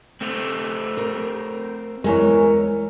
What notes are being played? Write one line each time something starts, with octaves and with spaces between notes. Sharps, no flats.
A3 C4
A#4
E2 E3 G#3 A#4 C#5